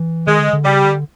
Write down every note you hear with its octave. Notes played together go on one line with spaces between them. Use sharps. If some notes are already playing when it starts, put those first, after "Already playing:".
Already playing: E3
D#3 G#3
D3
D3
C#3 G3
D3